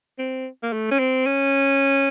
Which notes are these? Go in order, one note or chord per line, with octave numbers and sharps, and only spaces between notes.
C4
A#3
A3
C#4
C4
C#4